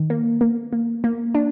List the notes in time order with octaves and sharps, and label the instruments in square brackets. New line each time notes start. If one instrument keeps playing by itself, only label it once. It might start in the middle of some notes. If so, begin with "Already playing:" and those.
Already playing: [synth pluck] D#3
A#3
A#3
A#3
A#3
D4